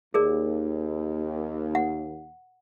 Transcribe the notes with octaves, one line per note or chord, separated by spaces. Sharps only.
D#2 G#4 A#4 D5
F#5